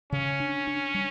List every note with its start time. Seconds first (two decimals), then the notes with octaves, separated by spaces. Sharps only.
0.12 C#3 C#4
0.40 D4
0.67 D4
0.94 G3